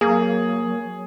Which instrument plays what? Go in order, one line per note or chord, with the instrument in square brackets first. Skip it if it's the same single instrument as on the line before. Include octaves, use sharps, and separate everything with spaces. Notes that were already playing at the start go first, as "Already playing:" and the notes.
[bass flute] F#3 [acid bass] A#3 [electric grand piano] G#4